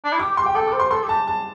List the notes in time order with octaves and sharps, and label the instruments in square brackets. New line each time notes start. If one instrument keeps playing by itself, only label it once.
[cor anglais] D4
E4
[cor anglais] G4 [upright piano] D6
[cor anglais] G4
[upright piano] C6
[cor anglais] G4 [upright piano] G5
[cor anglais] A4 [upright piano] G5
[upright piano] D6
[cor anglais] C5
[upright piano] C6
[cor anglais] A4 [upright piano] C6
[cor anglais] G4
[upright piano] A5
A5